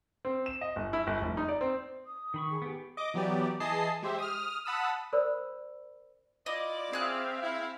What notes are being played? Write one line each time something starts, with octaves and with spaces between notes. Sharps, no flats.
C4
E7
D#5
G1
E4
G1
F1
D#4
D5
C4
D#6
D#3 B5 C#6
G#4
B3 G4
D#5 D6
E3 F#3 B3 G4 D5
E3 G#4 D#5 A5 C7
G#3 G4 C5 E5
D#6 F6
F#5 A5 B5 D#6 E6
A#4 C5 D5 B5 E6
E4 F4 D5 D#5
C4 G#4 E5 F5 F#6
E4